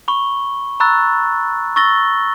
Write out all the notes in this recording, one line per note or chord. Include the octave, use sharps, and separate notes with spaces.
B5 C#6 G7
A#5 B5 C#6 E6 F#6 A6
C#6 E6 A6 A#6 G7